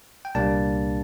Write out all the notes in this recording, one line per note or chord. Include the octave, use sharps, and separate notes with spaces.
G5
C2 A#2 G3 A#3 D4 A5